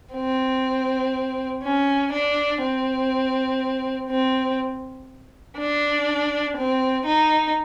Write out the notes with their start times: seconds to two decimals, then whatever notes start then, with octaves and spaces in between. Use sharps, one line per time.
0.14 C4
1.63 C#4
2.12 D4
2.62 C4
4.10 C4
5.58 D4
6.57 C4
7.06 D#4